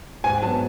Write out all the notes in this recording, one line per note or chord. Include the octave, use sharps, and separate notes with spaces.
G#2 G#5
F#3 B3 A5